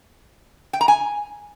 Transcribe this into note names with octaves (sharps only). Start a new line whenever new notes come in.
G5
A#5
G#5